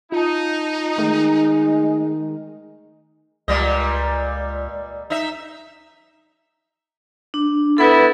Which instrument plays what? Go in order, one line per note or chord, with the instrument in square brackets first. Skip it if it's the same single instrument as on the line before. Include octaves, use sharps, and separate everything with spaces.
[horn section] D#4 [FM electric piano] F4 A5
[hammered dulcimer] D#3 [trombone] G#3 [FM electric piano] A3
[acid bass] C#2 [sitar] A#2 G3 D#5
[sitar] D#4 E5
[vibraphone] D4
[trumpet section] B3 E4 [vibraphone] A4 B4